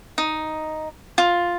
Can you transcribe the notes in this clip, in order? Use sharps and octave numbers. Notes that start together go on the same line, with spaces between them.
D#4
F4